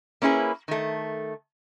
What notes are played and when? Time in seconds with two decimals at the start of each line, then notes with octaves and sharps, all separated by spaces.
0.22 A#3 C#4 E4 G#4 B4
0.68 D#3 A3